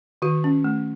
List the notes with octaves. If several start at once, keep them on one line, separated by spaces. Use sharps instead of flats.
D#3 F#4
C#4
A3